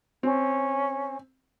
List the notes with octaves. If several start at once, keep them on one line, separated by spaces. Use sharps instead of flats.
C4 C#4